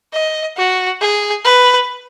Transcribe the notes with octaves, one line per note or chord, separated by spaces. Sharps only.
D#5
F#4
G#4
B4